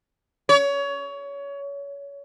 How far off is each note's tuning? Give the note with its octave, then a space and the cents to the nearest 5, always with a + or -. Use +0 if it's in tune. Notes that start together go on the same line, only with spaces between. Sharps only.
C#5 +25